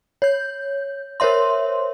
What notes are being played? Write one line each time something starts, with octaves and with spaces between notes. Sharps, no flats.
C#5 G6
A#4 C5 C#5 E5 C6